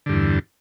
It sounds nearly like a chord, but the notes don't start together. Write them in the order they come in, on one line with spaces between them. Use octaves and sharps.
D3 G2 E2